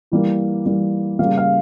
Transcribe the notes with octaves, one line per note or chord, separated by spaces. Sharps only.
E3 G3 A#3
E3 G3 A#3
C#3 G3 A#3 F5
F5